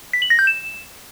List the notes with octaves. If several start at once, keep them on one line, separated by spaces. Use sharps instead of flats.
B6
F#7
A#6
G6
E7